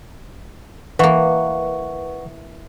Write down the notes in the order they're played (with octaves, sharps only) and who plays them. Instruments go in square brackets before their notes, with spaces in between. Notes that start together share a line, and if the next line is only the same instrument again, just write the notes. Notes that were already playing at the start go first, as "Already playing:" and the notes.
[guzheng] E3 A#3 [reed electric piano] B4 F#5 C#6